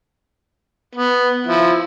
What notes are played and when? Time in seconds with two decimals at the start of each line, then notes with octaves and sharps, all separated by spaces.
0.95 B3
1.47 F3 E4